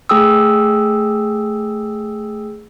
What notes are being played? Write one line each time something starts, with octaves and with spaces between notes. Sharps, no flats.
A3 G#4 G5 D#6 E6